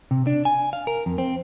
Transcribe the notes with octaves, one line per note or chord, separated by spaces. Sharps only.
C3
D4
G#5
F5
A#4
F2
C4